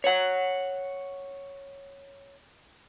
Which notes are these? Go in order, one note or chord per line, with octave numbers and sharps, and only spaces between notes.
C#5 F#5